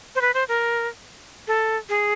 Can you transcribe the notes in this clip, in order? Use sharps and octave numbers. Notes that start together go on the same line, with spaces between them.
C5
B4
C5
A#4
A4
G#4